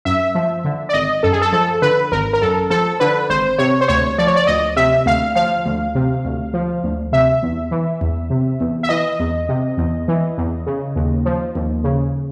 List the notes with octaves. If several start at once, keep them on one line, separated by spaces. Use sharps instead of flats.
F#2 E5
F3
D3
D5
G#1 D#5
F#2 A4
G#4
A4
F3 A4
D3 B4
G#1 A#4
A#4
F#2 A4
F3 A4
D3 B4
G#1 C5
C3 C#5
C5
D2 C#5
F3 D5
C#5
D5
D2 D#5
C3 E5
D2 F5
F3 F5
D2
C3
D2
F3
D2
C3 E5
E2
E3
E2
C3
E2
E5
E3 D#5
E2
C3
E2
E3
E2
C#3
D#2
F3
D#2
C#3